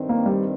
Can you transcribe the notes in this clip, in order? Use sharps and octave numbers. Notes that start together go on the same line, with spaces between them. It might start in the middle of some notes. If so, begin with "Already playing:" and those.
Already playing: G2 D#3 C4
A#3
G3